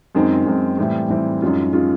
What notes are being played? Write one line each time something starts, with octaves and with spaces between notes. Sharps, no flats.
F#2 D#3 G#3 C4
F#2 D#3 G#3 C4
A2 E3 G3 C4 E4
A2 E3 G3 C4 E4
F#2 D#3 G#3 C#4 F4
D#3 G#3 C#4 F4